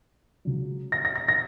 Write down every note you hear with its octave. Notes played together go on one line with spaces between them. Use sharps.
C#2 C#3 F#3
A#6
A#6
A#6
A#6